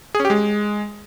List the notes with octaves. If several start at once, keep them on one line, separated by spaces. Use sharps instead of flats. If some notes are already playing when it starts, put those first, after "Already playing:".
G#4
C#4
G4
G#3